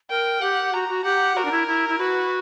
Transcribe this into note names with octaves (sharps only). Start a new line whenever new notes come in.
A#4 G5
G4 F#5
F#4 A#5
F#4
G4 F#5
F#4 A#4
D4
E4
E4
E4
F#4 B4